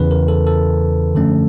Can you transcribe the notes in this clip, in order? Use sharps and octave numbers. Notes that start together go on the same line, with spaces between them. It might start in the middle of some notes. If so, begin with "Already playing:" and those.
Already playing: E2 C#3 E3 B4
A#4
A4
A4
F#2 D3 F3 A3 C#4 A4